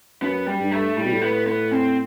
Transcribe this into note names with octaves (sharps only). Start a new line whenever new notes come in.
F#2 B3
G3
G2
A3
A2 G3
B2
A2
B3
B3
C4